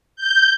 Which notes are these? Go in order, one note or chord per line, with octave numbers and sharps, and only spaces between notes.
G6